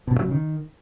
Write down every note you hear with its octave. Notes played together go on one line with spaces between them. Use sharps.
B2
G2
F#3
C#3
D#3